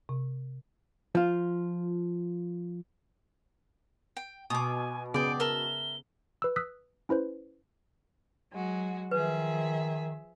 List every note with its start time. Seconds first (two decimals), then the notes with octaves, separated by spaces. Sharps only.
0.09 C3
1.15 F3 F4
4.17 G5
4.50 B2 G#5 D6 D#6
5.14 C#3 B3 G#4 D5 G5 D7
5.40 A#4 E5 A5 G7
6.42 B4 E6
6.56 D#6 E6 F#6 B6
7.09 C#4 E4 B4 C5
8.52 F#3 G#3 F#4
9.11 D#3 F3 G#4 B4 E5